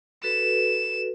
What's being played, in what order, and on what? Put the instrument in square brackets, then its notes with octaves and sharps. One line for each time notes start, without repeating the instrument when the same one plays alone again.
[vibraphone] F#4 A4 B4 [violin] E7